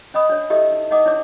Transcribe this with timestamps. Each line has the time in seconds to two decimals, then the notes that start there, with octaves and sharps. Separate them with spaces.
0.14 C#4 D#5 B5 D#6
0.29 D4 C#5
0.50 E4 G4 A4 A#4 D#5 E5
0.72 D#4
0.91 D#4 D#5 F#5 D6 D#6
1.05 D4 E4 C#5 D6